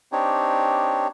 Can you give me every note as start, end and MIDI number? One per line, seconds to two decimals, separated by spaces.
0.12 1.07 60
0.12 1.07 62
0.12 1.07 63
0.12 1.07 67
0.12 1.07 73